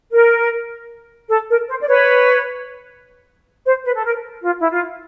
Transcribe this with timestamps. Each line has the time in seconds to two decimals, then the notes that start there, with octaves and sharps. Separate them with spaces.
0.12 A#4
1.29 A4
1.50 A#4
1.69 C5
1.81 D5
1.88 B4 C#5
3.65 C5
3.85 B4
3.95 A4
4.04 A#4
4.43 F4
4.59 E4
4.70 F4